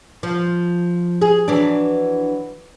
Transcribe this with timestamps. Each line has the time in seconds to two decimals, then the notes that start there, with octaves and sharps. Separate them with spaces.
0.23 F3
1.22 G#4
1.48 E3 F#3 D4